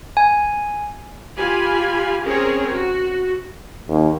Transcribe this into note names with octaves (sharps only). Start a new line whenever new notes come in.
G#5
F4 G4 G#5 B5
C4 C#4 G#4 A#4 C#5
F#4
D#2